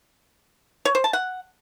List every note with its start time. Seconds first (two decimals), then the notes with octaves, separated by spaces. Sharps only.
0.85 C#5
0.95 C5
1.04 A5
1.13 F#5